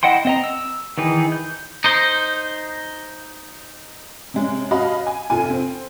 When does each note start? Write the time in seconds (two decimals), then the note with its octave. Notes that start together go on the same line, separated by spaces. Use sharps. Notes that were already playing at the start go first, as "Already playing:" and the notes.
0.03 E4 D#5 F#5 G5 C6
0.25 C4 D#5 A#5
0.44 E6
0.98 D#3 E3 D#4 G#4
1.32 G6
1.84 D#4 C5
4.34 C3 G#3 C#4
4.71 C#4 F#4 D#5 F5 A5 B5
5.07 G#5
5.30 F1 F4 G#5
5.50 C4